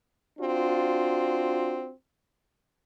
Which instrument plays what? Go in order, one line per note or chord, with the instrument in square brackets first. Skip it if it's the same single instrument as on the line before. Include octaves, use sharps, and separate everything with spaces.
[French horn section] C4 D4 F4 F#4